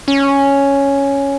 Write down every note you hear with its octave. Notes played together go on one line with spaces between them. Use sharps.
C#4